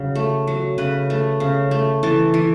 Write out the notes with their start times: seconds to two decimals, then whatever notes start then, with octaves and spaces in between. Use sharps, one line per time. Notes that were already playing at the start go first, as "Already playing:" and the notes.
Already playing: C#3 F#3
0.15 A3
0.47 F#3
0.78 C#3 B4
1.10 A3
1.40 C#3
1.71 A3
2.03 E3 A4
2.34 E3